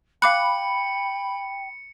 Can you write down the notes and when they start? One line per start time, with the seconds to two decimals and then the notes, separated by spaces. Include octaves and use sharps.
0.22 F5 G5 B5 D6 F#6 C#7